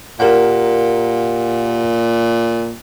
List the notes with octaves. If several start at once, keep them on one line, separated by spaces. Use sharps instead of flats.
A#2 G4 A#4 F#5